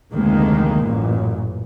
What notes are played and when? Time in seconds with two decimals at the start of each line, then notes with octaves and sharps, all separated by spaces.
0.12 F1 D2 D#3 G#3 A#3
0.84 A1 F#2 A#2